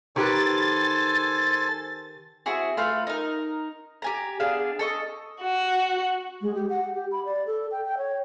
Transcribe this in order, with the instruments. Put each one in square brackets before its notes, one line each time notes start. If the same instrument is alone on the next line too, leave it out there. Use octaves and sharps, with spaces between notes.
[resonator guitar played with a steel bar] D#3 G4 B4 [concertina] A4 C5 G#5 [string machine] A6
[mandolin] C4 E4 F#4 G#4
A3 F4 B4 F5
D#4 A#4
G4 G#5 A#5
B3 D4 G#4 F5
A4 D#5 C#6
[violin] F#4
[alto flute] G#3
G4
F#5
G4
B5
D5
A4
G5
G5
C#5